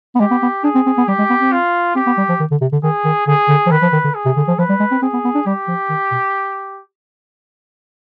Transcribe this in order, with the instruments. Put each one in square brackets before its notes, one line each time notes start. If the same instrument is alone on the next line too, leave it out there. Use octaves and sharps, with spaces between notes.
[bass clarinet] B3
[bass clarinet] G#3 [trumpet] G4
[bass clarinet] B3
B3
[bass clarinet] D4 [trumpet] G#4
[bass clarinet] C4
C4
B3
[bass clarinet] G3 [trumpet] G4
[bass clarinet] G#3
B3
C4
[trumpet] F4
[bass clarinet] C4 [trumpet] G4
[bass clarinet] B3
G3
F3
D#3
D3
C3
D3
[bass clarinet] D#3 [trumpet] G#4
[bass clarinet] D#3
[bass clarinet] D3 [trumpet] G#4
[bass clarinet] D3
F3
[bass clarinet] D#3 [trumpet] B4
[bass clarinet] F3
D#3
D3
[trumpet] G#4
[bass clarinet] C3
D3
F3
[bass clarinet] F3 [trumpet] B4
[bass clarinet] G3
G#3
C4
[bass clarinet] C4 [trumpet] G#4
[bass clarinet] B3
B3
D4
[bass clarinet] G3 [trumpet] G4
[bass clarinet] F3
D#3
B2